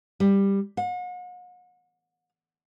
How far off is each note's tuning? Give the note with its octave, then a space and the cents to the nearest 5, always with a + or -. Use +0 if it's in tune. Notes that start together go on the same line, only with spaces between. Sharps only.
G3 +10
F#5 -40